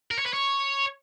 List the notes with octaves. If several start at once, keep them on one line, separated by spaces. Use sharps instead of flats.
A#4
C#5
B4
C#5